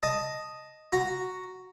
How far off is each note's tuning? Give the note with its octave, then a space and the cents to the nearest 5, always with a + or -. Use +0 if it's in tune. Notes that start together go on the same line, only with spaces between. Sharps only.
D#5 +0 A5 +0
F#4 +0 A#5 +0